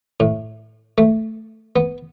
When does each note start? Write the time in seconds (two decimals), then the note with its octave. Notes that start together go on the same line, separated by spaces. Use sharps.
0.20 A2
0.98 A3
1.76 B3